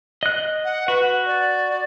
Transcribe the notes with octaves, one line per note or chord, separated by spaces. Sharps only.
D#5 F#6
F#5
F#4 B4
D5